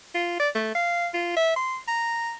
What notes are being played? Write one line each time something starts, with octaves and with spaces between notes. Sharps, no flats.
F4
D5
A3
F5
F4
E5
C6
A#5